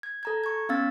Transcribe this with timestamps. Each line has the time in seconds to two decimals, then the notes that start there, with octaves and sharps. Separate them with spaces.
0.03 G#6
0.23 A4 A#5 G#6
0.44 C#6 G#6
0.69 B3 C#4 F5 E6 A6